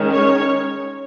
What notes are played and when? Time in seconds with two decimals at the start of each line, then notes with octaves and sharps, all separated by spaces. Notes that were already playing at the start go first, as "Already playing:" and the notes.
Already playing: D#3 G#3 C#4
0.12 C#5